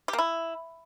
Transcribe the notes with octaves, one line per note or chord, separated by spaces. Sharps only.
G4
A#3
E4